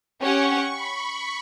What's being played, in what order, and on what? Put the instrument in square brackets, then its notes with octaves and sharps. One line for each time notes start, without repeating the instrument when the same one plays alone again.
[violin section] C#4 G4 C#5 F#5 [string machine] C#6
[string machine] B5